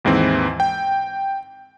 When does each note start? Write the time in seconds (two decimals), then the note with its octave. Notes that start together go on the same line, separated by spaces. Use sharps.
0.05 D#2 G#2 E3 C4
0.60 G5